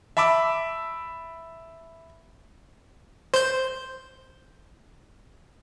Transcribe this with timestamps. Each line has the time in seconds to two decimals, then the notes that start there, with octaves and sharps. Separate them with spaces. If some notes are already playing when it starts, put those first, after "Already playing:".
0.17 E5 A5 B5 D6 E6
3.34 C5 G6